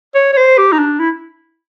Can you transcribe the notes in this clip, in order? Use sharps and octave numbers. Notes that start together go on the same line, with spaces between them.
C#5
C#5
C5
G4
D#4
D4
E4